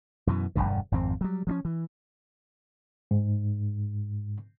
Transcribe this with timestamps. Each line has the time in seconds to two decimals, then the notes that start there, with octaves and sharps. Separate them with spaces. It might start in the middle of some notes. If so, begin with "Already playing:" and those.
0.27 F#2 B2 E3
0.55 E1 A#1 G2 D3
0.92 G#1 F2 C4
1.21 F#3 G3
1.47 F3 A3 C#4
1.65 E3
3.11 G#2